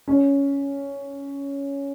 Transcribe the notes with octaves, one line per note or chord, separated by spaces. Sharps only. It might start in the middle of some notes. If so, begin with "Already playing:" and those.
C#4